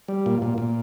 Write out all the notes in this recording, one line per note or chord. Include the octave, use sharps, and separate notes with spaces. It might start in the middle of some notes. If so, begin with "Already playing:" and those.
G3
A#2
A#2
A#2